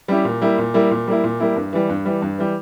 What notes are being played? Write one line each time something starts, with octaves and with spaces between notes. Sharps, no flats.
G3 C#4 E4 G4
A#2
G3 A#3 E4
A#2
G3 A#3 E4
A#2
G3 A#3 E4
A#2
G3 A#3 E4
G2
E3 G3
G2
E3 G3
G2
E3 G3